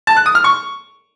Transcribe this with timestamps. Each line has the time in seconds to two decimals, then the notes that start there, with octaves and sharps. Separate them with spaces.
0.07 A5
0.17 F#6
0.26 D#6
0.35 F6
0.44 C#6